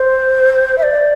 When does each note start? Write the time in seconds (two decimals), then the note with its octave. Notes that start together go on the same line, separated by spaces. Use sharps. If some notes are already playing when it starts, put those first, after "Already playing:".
Already playing: C5
0.78 E5
0.83 D5